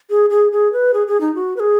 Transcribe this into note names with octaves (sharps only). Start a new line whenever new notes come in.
G#4
G#4
G#4
B4
G#4
G#4
D#4
F#4
B4
G#4